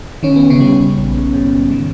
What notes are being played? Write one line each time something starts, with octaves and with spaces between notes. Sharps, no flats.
D#3 C#4
B3
C#3 C#4
G3
A#1
G#2
D#3